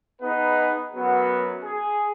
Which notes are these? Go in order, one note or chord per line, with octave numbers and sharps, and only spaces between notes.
B3 D#4 G#4 B4
F#2 F#3 B3
G#4